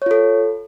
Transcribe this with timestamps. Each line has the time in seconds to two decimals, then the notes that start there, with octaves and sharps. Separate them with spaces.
0.02 C#5
0.06 F4
0.11 A4